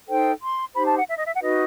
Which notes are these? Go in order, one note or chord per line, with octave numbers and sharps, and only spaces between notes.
D#4 A4 C5 G5
C6
D#4 G4 C5 B5
A5
F#5
E5
D#5
E5
F#5
D#4 F#4 B4 D#5